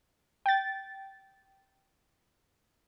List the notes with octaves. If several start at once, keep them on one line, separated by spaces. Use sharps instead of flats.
G5 A6